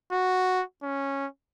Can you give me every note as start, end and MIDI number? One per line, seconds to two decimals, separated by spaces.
0.12 0.62 66
0.83 1.26 61